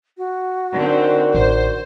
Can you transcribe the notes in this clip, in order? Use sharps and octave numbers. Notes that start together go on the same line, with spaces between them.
F#4
D3 C4 D#4 A#4 D5
A1 C5